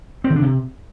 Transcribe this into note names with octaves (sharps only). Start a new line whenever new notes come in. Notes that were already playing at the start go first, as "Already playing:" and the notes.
C4
D#3
D4
C3